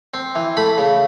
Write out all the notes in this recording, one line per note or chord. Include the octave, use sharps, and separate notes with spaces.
C4
E3
A3 B5
C#3